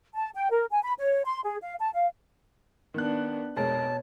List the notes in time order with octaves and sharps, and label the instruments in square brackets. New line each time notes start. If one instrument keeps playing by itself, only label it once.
[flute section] A5
G5
A#4
G#5
B5
C#5
C6
G#4
F5
A5
F5
[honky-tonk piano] D#3 F#6 [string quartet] B3 D4
[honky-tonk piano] F1 G#3 A#4 [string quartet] B2 [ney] C#5 [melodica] A5